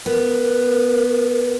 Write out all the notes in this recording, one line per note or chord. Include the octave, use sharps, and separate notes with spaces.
B3 A#4